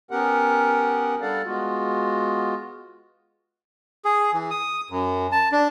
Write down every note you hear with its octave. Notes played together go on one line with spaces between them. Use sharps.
B3 C#4 G4 A#4 F#5
G3 D4 A4 D5 F5 F#5
G#3 B3 F4 F#4
G#4
E3
D#6
F#2
A5
D4